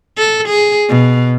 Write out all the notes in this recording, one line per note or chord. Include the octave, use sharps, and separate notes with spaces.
A4
G#4
B2